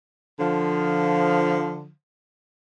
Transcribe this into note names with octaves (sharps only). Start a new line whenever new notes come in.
D3 F3